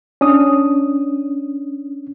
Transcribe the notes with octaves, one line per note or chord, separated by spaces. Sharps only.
C#4 D4 D#6